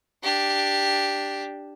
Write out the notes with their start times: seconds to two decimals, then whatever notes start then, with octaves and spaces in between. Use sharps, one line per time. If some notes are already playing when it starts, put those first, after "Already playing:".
0.23 D4 G4